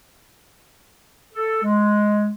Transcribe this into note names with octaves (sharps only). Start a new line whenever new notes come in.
A4
G#3